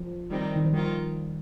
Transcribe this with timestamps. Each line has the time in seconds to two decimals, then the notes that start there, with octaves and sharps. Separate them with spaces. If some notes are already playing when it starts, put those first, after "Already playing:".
Already playing: F3
0.30 D#3 G3 C4 D#4
0.56 D#3
0.65 F3
0.73 D#3 G3 A#3 F4